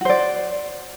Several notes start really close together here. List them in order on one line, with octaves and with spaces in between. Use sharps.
F#4 C5 D5